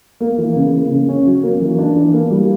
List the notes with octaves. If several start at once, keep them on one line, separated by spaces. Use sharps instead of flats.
A#3
E3
C#3
A#3
C#3
C#4
F#3
A#3
E3
D4
E3
A#3
G3